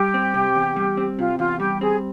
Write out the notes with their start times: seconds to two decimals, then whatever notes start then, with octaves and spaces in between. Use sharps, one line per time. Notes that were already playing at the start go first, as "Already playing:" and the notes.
Already playing: G3 G4
0.14 C4
0.34 C3
0.55 E2
0.76 G3
0.97 C4
1.18 C3 F4
1.39 E2 F4
1.60 G3 G4
1.81 C4 G#4